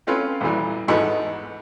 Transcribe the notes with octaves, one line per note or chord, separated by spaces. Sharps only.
A3 C4 C#4 F4 B4
A1 E2 A#2 E3 G3
E2 G#2 B3 D#4 A4 B5